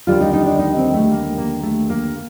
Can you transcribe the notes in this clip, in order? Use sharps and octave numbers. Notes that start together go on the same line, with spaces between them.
D#2 D3 G3 F4
D#4
D#4
D4
D#4
C4
A3
A#3
A#3
A3
A#3